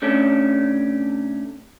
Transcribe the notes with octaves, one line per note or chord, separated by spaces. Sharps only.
C3 A3 C#4 D4